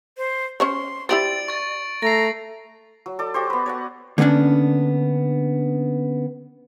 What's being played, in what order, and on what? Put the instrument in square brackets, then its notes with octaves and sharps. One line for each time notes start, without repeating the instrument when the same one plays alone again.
[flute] C5
[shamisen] C#4 C5 C#5 [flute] C6
[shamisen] E4 G4 C5 [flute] D5 [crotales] A6 D7 F#7
[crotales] C#6 A6
[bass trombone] A3 [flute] A#5 [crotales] A#6 C7
[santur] F#3
A4 D5
F#4 G4 C5
B3 B4
C#5 D5 F#5
[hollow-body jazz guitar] D3 A#3 B3 C#4 D4